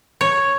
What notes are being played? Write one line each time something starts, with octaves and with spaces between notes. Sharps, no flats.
C#5